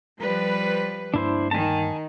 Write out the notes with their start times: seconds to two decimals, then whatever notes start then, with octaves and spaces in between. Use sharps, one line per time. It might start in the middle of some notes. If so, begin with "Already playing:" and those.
0.18 F3 G3 B4
1.14 D2 G2 A#3 D4 E4 C5
1.51 D#3 G#5 A5